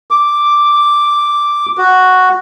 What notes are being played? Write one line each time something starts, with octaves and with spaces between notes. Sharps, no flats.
D6
F#4